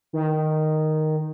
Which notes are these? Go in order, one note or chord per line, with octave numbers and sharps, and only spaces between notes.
D#3